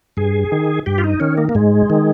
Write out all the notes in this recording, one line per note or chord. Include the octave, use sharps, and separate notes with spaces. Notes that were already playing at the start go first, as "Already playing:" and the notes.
G2 G#4
D#3
G2 G4
F4
D#4
D#3 C#4
A#3
A#3
G#2 G#3
D#3